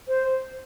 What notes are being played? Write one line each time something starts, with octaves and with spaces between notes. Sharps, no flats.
C5